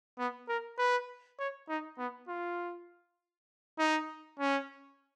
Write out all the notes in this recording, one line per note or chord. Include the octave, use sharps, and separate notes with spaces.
B3
A#4
B4
C#5
D#4
B3
F4
D#4
C#4